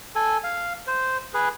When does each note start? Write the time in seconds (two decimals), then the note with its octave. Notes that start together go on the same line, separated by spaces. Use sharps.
0.15 A4 G#5
0.44 F5
0.87 C5
1.34 G#4 B4